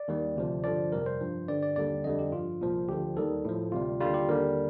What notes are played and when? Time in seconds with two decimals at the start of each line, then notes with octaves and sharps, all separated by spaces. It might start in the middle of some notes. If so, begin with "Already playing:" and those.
Already playing: D5
0.08 D#2 D#3 G3
0.36 D2 C3 F3
0.64 G2 D3 F3 D5
0.92 F2 C3 G3 A#4
1.06 C5
1.21 G2 F3
1.48 G2 D3 G3 D5
1.63 D5
1.76 D#2 D3 G3 D5
2.04 F2 D3 G3 D#5
2.19 G4
2.32 G2 F3 F4
2.61 C2 A#2 F3
2.89 D2 D3 F3 G4
3.16 D#2 D#3 G3 A4
3.45 A2 F3
3.72 D2 C3 G3 F4
4.00 D#2 D3 G3 F4
4.14 G4
4.29 D#2 D3 G3 A#4